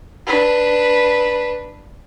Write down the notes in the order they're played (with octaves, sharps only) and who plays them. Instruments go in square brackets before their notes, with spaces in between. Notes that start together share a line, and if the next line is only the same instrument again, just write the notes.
[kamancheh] D4 B4